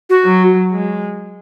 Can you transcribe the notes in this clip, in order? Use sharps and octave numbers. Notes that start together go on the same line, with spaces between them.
F#4
F#3
G#3